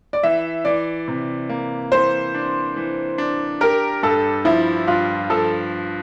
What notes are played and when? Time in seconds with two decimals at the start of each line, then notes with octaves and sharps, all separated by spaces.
0.13 D5
0.23 E3 E5
0.65 E3 D5
1.08 C3
1.49 A#3
1.92 E3 C5
2.34 D4
2.76 E3
3.18 D4
3.61 G4 A#4
4.03 G2 A4
4.45 F3 E4
4.88 G2 F4
5.30 F3 A4